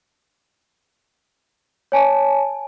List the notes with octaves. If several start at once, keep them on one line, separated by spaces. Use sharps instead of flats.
C#5 G#5 A5